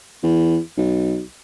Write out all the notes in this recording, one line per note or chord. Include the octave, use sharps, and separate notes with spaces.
E2
B1